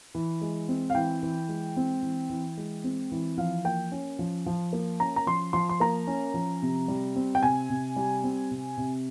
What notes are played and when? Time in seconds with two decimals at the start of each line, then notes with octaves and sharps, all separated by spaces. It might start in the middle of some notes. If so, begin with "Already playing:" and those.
0.15 E3
0.41 G#3
0.69 C4
0.90 F5
0.95 E3 G5
1.23 E3
1.49 G#3
1.77 C4
2.03 E3
2.29 E3
2.57 G#3
2.84 C4
3.12 E3
3.38 F3 F5
3.65 A#3 G5
3.92 C#4
4.19 F3
4.46 F3
4.73 A#3
5.00 C#4 A#5
5.16 A#5
5.27 F3 C6
5.53 F3 C6
5.69 C6
5.80 A#3 A#5
6.07 C#4
6.34 F3
6.62 C3
6.88 G3
7.16 C4
7.35 G5
7.43 C3 G#5
7.70 C3
7.96 G3
8.24 C4
8.51 C3
8.77 C3